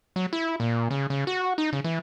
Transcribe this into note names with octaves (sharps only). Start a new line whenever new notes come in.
F#3
E4
A#2
C#3
C#3
F#4
D#4
C#3
E3